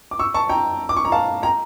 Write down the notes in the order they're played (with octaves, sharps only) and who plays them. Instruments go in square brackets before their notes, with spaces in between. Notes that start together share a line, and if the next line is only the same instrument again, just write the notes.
[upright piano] D6
C#6 E6
A5 C#6
G5 A#5
D6
C#6
A#5
F5 A5
G5 A#5